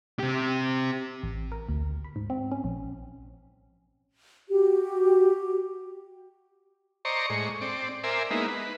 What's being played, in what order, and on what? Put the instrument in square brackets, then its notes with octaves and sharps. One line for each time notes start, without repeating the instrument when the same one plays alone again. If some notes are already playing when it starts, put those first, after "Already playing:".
[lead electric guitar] C4 G4
[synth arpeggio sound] A1
A#4
D2
B5
G#2
C4
C#4
A#1
[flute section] F#4 G4
[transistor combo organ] C5 D5 D#5 A#5 C#6
A2 G#3 C#6
C4 D5
A#4 C5 D5 E5 G#5
G#3 A#3 B3 D#4 E4
B4